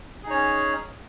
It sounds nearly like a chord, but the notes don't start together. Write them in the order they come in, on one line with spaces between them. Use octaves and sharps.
G#4 D#4 C#5 C#4